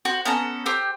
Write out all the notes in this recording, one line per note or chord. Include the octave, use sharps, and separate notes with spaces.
F#4 C5
B3 C#4 A4 A#5
G4 C5 E6